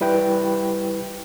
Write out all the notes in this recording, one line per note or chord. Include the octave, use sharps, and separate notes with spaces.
G3 E4 B4 G5